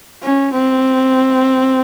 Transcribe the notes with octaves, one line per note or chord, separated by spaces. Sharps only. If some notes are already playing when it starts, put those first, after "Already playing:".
C#4
C4